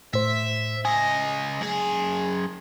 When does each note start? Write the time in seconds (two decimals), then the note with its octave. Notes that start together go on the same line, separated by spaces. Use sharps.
0.14 A2 C5 E5
0.85 C#2 D#5 G#5
1.61 F#2 G#4